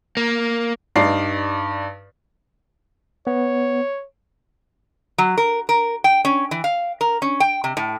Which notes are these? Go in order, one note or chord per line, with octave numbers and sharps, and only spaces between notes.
A#3
G2 D#4 D5 C7
B3 C#5
F#3
A#4
A#4
G5
C#4
E3
F5
A#4
C#4
G5
C3
A2